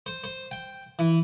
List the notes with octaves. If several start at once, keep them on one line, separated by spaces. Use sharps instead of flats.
C5
C5
G5
E3